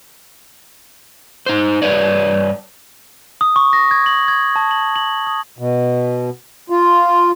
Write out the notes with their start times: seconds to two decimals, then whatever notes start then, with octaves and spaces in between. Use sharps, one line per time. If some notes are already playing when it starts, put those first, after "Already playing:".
1.46 D#4 C5
1.82 G2 E3 B4 C#5 D5
3.41 D#6
3.56 C#6
3.73 A#6
3.91 G#6
4.06 F#7
4.28 G#6
4.56 A5
4.71 F#7
4.96 F#7
5.27 D#6
5.59 B2
6.70 F4